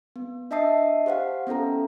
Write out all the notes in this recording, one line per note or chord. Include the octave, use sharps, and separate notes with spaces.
B3
D4 D#5 E5 A5 D#6 C7
G4 C5 F5 F#5
B3 C#4 E4 A4 A#5